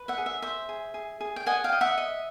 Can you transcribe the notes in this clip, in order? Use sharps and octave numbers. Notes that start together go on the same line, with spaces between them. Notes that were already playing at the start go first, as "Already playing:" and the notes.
Already playing: B4
E5 F#5
G#4
E5
C5 E5
G#4
G#4
G#4
G5
D#5 F#5 G#5
F5 G5
D#5
E5 F#5
D#5